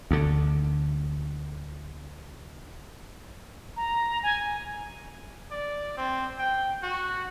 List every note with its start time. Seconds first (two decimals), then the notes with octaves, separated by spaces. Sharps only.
0.11 D2 D3
3.76 A#5
4.23 G#5
5.51 D5
5.97 C4
6.38 G5
6.83 F#4